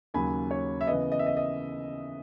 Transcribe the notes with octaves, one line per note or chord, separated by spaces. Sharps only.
D#2 C#3 F#3 G#5 B5
C#5
E5
C#3 E3 B3 D#5
D#5
E5
D#5
D#5